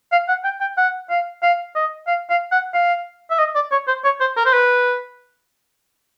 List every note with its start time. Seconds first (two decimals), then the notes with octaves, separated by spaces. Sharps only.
0.12 F5
0.28 F#5
0.45 G5
0.61 G5
0.77 F#5
1.10 F5
1.43 F5
1.75 D#5
2.08 F5
2.30 F5
2.52 F#5
2.74 F5
3.31 E5
3.39 D#5
3.55 D5
3.72 C#5
3.88 C5
4.05 C#5
4.21 C5
4.37 A#4
4.46 C5
4.54 B4